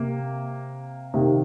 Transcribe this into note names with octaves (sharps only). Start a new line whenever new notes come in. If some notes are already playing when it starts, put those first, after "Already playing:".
Already playing: C3 A#3
C3 D#3 A#3